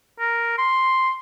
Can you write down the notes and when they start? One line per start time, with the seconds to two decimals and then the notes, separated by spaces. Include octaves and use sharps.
0.19 A#4
0.58 C6